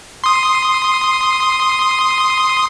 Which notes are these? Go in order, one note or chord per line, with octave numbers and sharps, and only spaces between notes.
C6 D#6